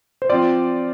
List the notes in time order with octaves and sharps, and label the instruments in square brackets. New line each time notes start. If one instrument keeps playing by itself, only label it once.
[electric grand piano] C5
[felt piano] F3 C4 F4 [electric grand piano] D5